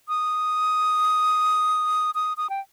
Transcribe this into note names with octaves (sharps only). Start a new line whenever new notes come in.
D#6
D#6
D#6
G5